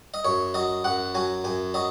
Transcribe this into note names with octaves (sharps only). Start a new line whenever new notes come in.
D#5
F#2 C#5
F#3 D#5
F#2 F#5
F#3 G#5
F#2 G#5
F#3 D#5